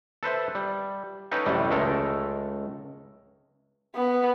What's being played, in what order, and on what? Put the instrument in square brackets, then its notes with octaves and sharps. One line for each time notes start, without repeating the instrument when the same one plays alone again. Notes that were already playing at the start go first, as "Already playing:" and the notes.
[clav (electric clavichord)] A4 B4 C5 E5
G3
C#4 D#4 A4 B4 F5 G5
A1 F#2 A2 C3 G3
C#2 G#3 A3 A4 A#4
[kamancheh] B3